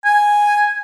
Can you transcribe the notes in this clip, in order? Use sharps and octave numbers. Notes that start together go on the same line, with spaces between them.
G#5